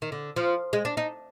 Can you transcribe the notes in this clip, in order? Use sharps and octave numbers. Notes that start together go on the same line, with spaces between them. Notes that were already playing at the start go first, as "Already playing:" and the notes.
D#3
D3
F3
G#3
D4
D#4